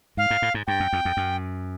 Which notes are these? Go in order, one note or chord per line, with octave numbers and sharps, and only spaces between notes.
G#2 F5
G#2
A2
G#2
G2 G5
F#2
F2
F2
F#2